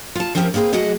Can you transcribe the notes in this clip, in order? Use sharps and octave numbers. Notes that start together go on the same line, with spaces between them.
F4 A5
F3 C4 C#4 E4 G4 A#4
A#3 C4 G#4 B4 C5
F#3 A3 F#4 G#4 D#5